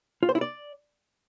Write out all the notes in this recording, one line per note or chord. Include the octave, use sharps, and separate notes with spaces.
F4
C5
E4
D5